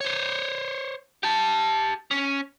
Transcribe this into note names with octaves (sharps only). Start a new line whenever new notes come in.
C5 C#5
G4 A5
C#4